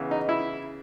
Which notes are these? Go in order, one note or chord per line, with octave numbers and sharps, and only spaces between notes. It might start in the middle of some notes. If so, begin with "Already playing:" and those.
Already playing: C#3 E3 B3
D#4
E4